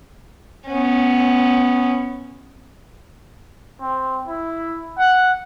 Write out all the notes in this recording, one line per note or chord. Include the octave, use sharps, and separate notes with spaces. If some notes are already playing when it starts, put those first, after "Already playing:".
B3 C#4
C4
E4
F#5